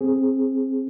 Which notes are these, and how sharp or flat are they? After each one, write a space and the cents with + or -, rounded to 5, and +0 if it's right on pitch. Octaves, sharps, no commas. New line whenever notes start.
C4 +15 G#4 +0